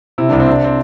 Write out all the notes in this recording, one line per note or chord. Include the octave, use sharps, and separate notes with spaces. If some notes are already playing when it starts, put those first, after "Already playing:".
C3 E4
C2 D4
C4
C3 D4
C4